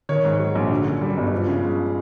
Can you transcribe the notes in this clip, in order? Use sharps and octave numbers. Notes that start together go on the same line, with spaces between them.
D#3 C#5
G#2
F#3
A#1
D3
F#2
G3
G1
F3
C#3
G#3